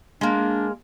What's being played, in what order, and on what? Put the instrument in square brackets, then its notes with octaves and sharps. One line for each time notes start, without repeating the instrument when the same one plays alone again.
[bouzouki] G#3 A#3 [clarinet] D4